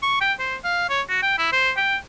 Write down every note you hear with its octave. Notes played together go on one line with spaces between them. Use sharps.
C#6
G5
C5
F5
C#5
F#4
G5
E4
C5
G5